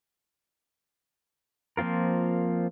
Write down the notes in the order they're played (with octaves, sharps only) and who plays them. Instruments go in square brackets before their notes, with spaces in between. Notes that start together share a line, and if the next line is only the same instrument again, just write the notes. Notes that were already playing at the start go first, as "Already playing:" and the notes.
[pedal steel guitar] F3 A#3 C4 F4 A#4